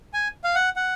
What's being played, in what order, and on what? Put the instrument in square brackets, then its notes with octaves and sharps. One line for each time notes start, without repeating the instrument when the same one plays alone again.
[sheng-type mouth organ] G#5
F5
F#5
F#5